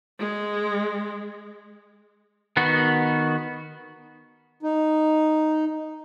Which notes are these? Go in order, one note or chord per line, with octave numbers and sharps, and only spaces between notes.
G#3
D#3 B3 F#4
D#4